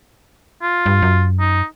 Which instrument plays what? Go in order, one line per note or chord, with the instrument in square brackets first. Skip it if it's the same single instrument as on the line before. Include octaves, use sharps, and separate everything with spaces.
[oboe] F4
[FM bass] G2
F#2
[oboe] D#4